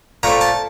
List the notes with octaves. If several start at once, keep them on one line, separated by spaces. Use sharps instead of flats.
A#2 A3 C4 A#5
A5